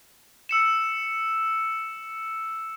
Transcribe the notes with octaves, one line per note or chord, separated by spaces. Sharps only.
E6 C#7 E7